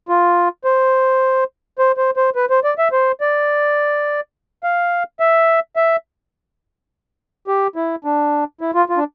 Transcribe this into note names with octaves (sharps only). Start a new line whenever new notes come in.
F4
C5
C5
C5
C5
B4
C5
D5
E5
C5
D5
F5
E5
E5
G4
E4
D4
E4
F4
F4
D4